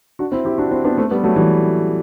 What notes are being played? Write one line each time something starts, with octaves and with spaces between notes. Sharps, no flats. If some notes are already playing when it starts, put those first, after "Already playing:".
D4 F#4
C4 E4
E4 G4
D4 F#4
C4 E4
B3 D4
A3 C4
G3 B3
F#3 A3
E3 G3